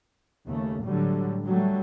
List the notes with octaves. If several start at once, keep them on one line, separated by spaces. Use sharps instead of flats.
D#2 C#3 A3
A2 D3 F#3 G3
F#3 G3 A3